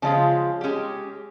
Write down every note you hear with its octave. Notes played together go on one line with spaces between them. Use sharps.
C#3 F3 G#3 C#4 F4
G#3 C#4 G4